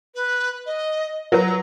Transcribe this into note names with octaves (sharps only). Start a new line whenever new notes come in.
B4
D#5
F#3 A#4 B4 A#5